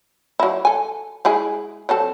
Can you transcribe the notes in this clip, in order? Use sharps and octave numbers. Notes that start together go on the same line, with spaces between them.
F#3 E4
A4 G#5
G#3 E4 G#4
F#3 C4 A4